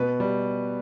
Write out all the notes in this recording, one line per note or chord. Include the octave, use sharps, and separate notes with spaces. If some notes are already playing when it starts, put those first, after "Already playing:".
Already playing: B2 B4
G3